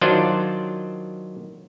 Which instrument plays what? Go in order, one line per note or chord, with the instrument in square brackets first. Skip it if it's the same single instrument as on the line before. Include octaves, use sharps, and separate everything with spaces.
[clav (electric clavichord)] D#3 F#3 D4 F4 C5 D5